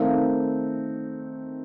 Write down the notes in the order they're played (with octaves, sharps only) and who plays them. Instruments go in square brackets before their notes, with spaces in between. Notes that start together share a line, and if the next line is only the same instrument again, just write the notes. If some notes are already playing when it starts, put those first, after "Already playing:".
Already playing: [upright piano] D#3 A3 C4 D#4 [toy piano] F5